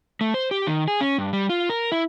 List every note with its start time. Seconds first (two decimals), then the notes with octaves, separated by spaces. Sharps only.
0.21 A3
0.34 C5
0.51 G4
0.67 D#3
0.88 G#4
1.01 C#4
1.18 G2
1.33 G3
1.50 F4
1.69 A#4
1.92 E4